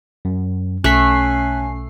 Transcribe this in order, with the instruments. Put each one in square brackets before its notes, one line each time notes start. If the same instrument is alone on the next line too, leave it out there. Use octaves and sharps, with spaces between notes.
[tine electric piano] F#2
[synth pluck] B1 C7 [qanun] A3 [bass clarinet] C#4 [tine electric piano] F#6 B6